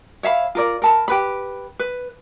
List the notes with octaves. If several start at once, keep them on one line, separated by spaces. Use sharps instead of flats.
C#5 E5 F5 B5
F4 A#4 D5
A#4 A5 B5
G4 B4 B5
B4